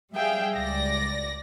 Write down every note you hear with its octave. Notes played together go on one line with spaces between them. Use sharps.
G3 G#4 E5 F5 G5
C#2 D5 A#6